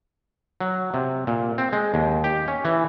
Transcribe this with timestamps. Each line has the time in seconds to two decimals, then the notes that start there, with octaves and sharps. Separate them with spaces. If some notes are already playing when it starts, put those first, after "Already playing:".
0.60 F#3
0.94 C3
1.27 A#2
1.58 C4
1.73 G#3
1.94 D#2
2.24 G4
2.48 C#4
2.65 E3